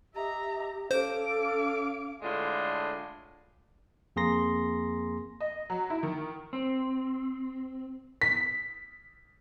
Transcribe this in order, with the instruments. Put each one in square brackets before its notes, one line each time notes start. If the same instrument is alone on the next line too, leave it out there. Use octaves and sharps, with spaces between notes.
[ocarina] G4 [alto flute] D#5 [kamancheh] E5 A#5
[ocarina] C#4 [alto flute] A4 [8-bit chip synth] C5 [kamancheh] F5 D6
[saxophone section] A2 D3 G#3 D4 F4
[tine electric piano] F2 A#3 G#4 A#5 C6 A#6
[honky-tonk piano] D#5
F#3
E4
D#3
[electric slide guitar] C4
[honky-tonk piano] B6